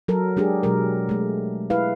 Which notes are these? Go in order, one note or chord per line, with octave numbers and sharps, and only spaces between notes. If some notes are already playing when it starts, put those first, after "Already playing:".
F#3 A4 A#4
G#3 D4 G4 G#4
B2 F#3 G#3 A#4
G#3 A3
E4 B4 F5